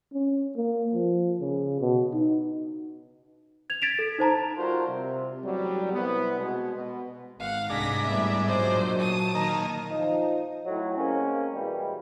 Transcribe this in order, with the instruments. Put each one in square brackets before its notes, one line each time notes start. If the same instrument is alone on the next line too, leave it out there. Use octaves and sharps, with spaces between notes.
[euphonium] C#4
A#3
F3
C#3
B2
D#4
[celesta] G#6 F7
G#6 A6 B6 D7 E7 F7
A4
D#4 C5 A5 A#5
[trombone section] G3 F4 F#4 A#4 C5
C3
A1 F#3 G3
C2 B3
B2 G#3
B2
[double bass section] G#1 [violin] F5 F#5
[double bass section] C2 [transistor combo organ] G#2 D4 [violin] A#6 B6
[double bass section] A2 G3 B3 [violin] E5
[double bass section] A#2 F#3 [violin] C5 D#5
[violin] A5 D#6
[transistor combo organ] D#3 A#3
[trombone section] F3 D#4
A2 F#3
G#3 A#3 C4 C#4
B2 E3 G3 G#3